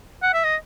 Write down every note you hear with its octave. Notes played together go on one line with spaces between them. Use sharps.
F#5
E5
D#5